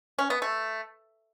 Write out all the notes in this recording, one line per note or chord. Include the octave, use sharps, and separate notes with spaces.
C#4
B3
A3